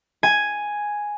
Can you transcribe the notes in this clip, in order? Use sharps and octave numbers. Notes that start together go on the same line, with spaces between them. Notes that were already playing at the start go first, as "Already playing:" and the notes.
G#5